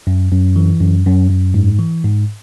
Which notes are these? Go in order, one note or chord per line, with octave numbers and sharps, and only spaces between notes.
F#2
F#2
E3
F#2
F#2
F#2
G#2
E3
G#2